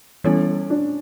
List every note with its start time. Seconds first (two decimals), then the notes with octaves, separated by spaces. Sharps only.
0.24 E3 G3 B3 C#4 E4 A4
0.70 D4